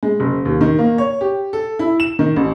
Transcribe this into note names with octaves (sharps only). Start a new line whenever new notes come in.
G#3
F#1
D#2
D#3
A#3
C#5
G4
A4
E4
E7
D#3
A1